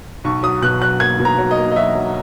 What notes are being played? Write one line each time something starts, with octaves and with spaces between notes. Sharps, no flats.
B1 C#6
F#3 D#6
B2 F#6
F#3 F#6
A#3 G#6
B2
A#5
F#3
D#5
A#3
D#5
F#3 E5
F#3